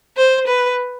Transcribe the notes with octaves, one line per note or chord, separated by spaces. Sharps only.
C5
B4